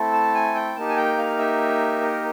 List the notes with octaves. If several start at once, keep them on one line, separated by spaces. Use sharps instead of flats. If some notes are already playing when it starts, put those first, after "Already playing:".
Already playing: A3 C4 E4 A4
A5
G#5
G5
A#3 D#4 G4 A5
G#5
G5
F5
E5
A#4